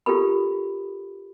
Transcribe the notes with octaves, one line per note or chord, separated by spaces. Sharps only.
F4 G4 A4 A#4 B5